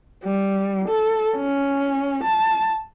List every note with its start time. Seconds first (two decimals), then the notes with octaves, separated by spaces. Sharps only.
0.24 G3
0.89 A4
1.37 C#4
2.23 A5